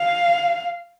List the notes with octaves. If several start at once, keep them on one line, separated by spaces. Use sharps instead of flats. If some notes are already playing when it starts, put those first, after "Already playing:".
Already playing: F5